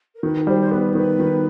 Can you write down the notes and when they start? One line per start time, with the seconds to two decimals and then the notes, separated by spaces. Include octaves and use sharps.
0.15 A#4
0.23 D#3 B4
0.47 G3 C5
0.60 C5
0.71 B3 B4
0.95 D#3 B4
1.20 D#3